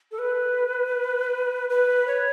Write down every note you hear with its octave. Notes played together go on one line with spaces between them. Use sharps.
A4
B4
B4
C#5